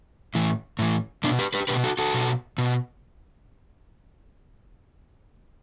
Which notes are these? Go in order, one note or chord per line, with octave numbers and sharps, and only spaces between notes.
A2 E3
A2 E3
B2 B3 D4
G4 B4
G4 B4
B2 G4 B4
F#4 A4
F#4 A4
B2
B2